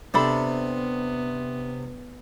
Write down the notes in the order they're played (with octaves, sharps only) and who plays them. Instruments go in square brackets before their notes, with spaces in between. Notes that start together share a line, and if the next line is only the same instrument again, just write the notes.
[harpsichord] C3 [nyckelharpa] B3 [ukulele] D4 A4 B5